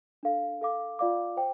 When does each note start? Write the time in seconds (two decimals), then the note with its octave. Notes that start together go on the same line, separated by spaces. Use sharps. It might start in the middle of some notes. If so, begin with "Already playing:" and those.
0.23 D4 A4 F5
0.61 A4 F5 D6
0.99 F4 D5 F5 D6
1.37 C5 G5